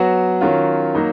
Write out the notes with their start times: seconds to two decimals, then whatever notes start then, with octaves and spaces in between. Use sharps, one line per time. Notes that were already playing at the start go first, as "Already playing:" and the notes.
Already playing: F#3 B3 F#4
0.41 D#3 F#3 C#4 F4
0.95 F#3 A#3 D#4